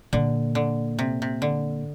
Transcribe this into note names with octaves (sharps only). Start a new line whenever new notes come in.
A#2 D3
D3
C3
C3
D3